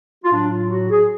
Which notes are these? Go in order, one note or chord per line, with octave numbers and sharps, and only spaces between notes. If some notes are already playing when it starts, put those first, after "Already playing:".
F4
A2 F#3 D4
F4
F#4
G#4